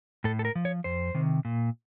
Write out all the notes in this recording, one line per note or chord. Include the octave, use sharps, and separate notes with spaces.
A2 A4
A4
A#4
F3
C#5
F2 C5
C3 D#3
A#2